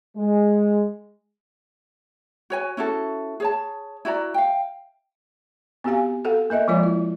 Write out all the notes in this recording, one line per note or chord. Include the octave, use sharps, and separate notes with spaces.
G#3
F#4 C#5 G#5
C#4 E4 F#4 A4
G#4 C#5 A5
E4 F#4 D5 A#5
F5 G5
B3 C4 F#4 G4 F5 G#5
F#4 A4 F5 F#5
A#3 A#4 D#5 E5
F3 G#3 A#3 F4 C#5 D5
E4